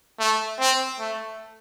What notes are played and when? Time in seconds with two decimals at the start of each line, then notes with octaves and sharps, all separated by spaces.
0.19 A3
0.59 C4
1.00 A3